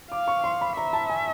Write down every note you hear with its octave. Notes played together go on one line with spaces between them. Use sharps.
F5 D6
C#6
C6
B5
E5 A#5
A5
G#5